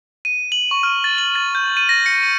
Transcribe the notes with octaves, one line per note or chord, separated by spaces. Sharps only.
D#7
F#7
C#6
F6
A6
F#7
A6
G6
D#7
A#6
C#7
D#7